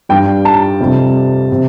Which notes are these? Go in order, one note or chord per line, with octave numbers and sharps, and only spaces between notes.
G2 G3 G5
A5
F2 C3 G3
C3